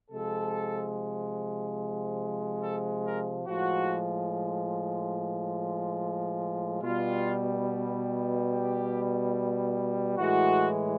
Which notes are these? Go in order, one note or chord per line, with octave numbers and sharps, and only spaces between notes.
C3 F3 G#3 A4
A4
A#4
A2 F3 G#3 F#4
B2 G3 F4
G4
A2 E3 G#3 F#4